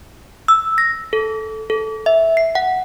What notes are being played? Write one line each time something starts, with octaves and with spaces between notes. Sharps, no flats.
E6
A#6
A4
A4
E5
C7
F#5